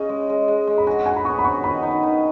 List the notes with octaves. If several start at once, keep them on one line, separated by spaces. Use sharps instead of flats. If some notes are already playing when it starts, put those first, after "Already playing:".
Already playing: C#3 C#4 D#5
G#3
G#3
G#3
G#3
B5
F#4 G#5
F#4 G#5
B5
B3 C#6
B5
F#4 C#6
D#3 B5
D#4
D#3